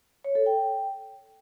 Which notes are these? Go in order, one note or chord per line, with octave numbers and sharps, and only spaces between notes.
C#5
A4
G5